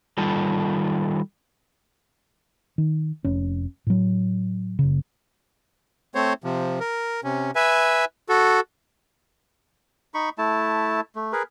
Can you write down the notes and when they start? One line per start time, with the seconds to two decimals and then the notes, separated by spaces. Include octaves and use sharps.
0.18 D#3 G3 F4 A4
2.78 D#3
3.24 F1 C#4
3.87 A2 F#3
4.79 F#1 C#3
6.15 A3 C4 C5 C#5
6.44 C3 F3
6.80 A#4
7.24 C3 C#4
7.55 B4 E5 G#5
8.29 F#4 A4
10.14 D#4 B5 C#6
10.38 A3 E4 A5
11.16 A3
11.33 G#4 A#4 B4